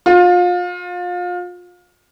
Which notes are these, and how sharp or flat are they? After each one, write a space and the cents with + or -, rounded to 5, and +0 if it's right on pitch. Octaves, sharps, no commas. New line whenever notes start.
F4 +30